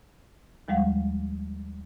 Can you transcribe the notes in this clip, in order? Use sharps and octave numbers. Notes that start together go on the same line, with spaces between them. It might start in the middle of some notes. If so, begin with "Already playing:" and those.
D#2 F3 G3 G#3 F5 F#5